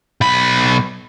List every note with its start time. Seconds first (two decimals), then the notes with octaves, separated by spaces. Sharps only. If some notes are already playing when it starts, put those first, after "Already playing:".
0.21 B1 B5